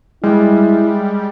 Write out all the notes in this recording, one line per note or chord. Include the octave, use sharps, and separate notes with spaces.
G3 G#3 E4